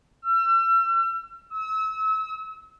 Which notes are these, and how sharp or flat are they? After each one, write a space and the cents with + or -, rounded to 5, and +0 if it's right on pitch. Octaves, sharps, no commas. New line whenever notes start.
E6 +40
E6 -35